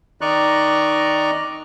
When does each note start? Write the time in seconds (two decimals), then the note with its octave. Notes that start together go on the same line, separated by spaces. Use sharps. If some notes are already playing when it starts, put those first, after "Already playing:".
0.21 D#3 D5 D#5 A#5 C#6 F#6